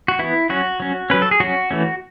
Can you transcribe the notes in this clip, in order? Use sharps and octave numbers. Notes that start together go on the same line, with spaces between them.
F#4
E3 B3 E4
F#3 C#4 F#4
F#3 C#4
F#3 C#4 B4
A4
G#4
F#3 C#4 F#4
E3 A3 C#4